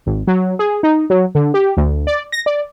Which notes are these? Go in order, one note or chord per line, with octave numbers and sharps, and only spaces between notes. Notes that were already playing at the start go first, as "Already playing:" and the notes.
G#1
F#3
G#4
D#4
F#3
D3
G4
D2
D5
A#6
D5